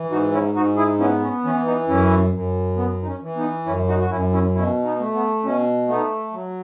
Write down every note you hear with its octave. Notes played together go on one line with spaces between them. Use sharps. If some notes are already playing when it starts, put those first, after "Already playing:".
Already playing: E3
G#2 D#4 F#4
C#4 E4
G#2 D#4 F#4
E4 G#4
B3 C#4 E4
C#4
E3 C#4
B3 D#4
F#2 C#4 E4
F#2
B3
D#4
C#4
E3
B3 D#4
F#2 C#4 E4
D#4 F#4
F#4
F#2 C#4 E4
C#4 E4
B2 C#4 E4
B3 D#4
A3
B3
B2 C#4
A3 B3 D#4
F#3